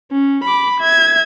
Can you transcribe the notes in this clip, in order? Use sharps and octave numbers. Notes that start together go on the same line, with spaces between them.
C#4
B5 D6
E5 G#6